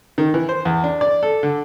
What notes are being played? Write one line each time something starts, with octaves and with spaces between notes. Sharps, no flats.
D#3
E3
C5
E2
D4
D5
A4
D3